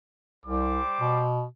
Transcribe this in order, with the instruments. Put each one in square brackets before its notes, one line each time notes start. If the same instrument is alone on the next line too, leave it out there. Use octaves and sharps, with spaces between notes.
[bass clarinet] C2 [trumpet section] G3 C5 D6
[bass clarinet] B2